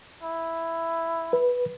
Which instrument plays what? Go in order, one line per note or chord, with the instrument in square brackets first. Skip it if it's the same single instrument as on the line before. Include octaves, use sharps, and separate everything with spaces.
[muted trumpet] E4
[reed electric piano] B4